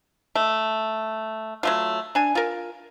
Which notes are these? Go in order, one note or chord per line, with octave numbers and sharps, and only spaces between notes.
A3
F#3 A3 F4
D4 G#5
F4 A#4